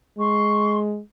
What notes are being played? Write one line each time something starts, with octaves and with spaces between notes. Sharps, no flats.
G#3 C6 C#6